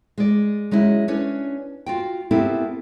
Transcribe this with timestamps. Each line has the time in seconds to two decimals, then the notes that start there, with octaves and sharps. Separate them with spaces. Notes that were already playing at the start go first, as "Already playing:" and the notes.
0.18 G#3 D5
0.71 F#3 G#3 C#4 E4
1.08 C#4 D4 B4 C#5
1.86 F4 F#4 G5
2.31 B3 C4 E4 G4 A4 A#4